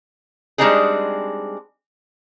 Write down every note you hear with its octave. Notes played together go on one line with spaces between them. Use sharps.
G3 G#3 C4 D4 D#4 G#4